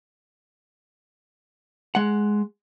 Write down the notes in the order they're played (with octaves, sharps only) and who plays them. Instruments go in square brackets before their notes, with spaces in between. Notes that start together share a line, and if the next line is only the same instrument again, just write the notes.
[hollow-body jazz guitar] G#3 F#5